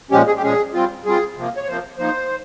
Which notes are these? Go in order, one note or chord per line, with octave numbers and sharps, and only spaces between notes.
A#2 F3 G#3 C#4 G4
G#4
G4
A#2 F3 G#3 C#4 G#4
G3 C4 F4
G3 C4 F4 G#4
C3 F3 A#3
C#5
C3 F3 A#3 C5
F3 A#3 D#4 C5